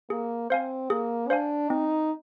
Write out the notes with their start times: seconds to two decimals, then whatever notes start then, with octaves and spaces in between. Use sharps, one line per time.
0.10 A#3 G#4
0.50 C4 C5 F5 G#5
0.90 A#3 G#4
1.30 D4 C5 F5 G#5
1.69 C4 D#4